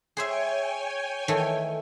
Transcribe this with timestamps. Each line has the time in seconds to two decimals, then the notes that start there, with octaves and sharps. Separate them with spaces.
0.17 G#4 C5 C#5 E5 G5 G#5
1.28 D#3 E3 A3